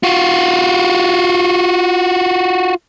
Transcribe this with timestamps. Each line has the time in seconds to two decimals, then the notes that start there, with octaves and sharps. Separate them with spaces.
0.03 F4 F#4